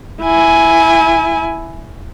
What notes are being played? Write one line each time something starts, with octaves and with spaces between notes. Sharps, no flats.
E4 G#5